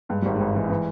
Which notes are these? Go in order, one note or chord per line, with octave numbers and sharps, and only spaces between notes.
G2 G#3
G#1 G3
G#3
G#1
E3
E3